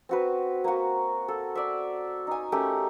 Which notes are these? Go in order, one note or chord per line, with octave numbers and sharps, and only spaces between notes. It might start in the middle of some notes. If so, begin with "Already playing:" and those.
C4 F#4 B4
A#3 F#4
A4
D5 E5
D#4 G#5
A3 C#4 G4 A#4